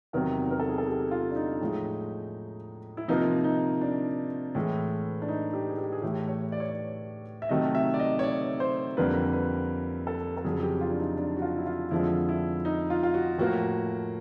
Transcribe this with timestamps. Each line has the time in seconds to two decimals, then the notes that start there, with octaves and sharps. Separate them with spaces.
0.13 E2 C3 D#3 F#3 A#4
0.51 A#4
0.60 A4
0.69 G#4
0.78 A4
0.87 G4
1.11 F4
1.30 D4
1.36 D#4
1.61 A2 F3 G#3
2.97 E4
3.08 C3 F3 A#3 D#4
3.44 D#4
3.81 D4
4.55 A2 E3 G#3
5.22 D4
5.28 D#4
5.53 G4
5.69 G#4
5.78 G4
5.93 G#4
6.02 A2 E3 A3 G4
6.28 C#5
6.52 D5
6.60 C#5
6.69 D5
7.42 E5
7.49 C3 D#3 F#3 A3 D#5
7.75 E5
7.94 D5
8.00 D#5
8.19 C#5
8.23 D5
8.60 C5
8.97 F2 D3 G3 A#3 B4
9.33 B4
10.07 A4
10.37 A4
10.44 F2 C#3 F#3 G#4
10.62 G4
10.81 F4
10.90 D4
10.99 D#4
11.17 D4
11.37 F#4
11.42 F4
11.57 E4
11.67 F4
11.91 F2 D3 F3 G#3 E4
12.29 E4
12.65 D#4
12.90 F4
13.03 F4
13.14 F#4
13.38 A2 F3 A#3 F#4